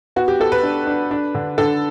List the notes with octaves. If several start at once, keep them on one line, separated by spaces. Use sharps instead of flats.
B3 F#4
G4
B3 A4
B4
D4
D4
D4
D3
D3 A4